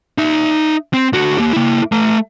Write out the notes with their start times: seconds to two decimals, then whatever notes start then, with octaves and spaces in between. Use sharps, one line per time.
0.18 D#4 E5
0.94 C4
1.13 D3 F#4
1.38 A#3 G4
1.53 A#3 E4
1.92 A3 A#5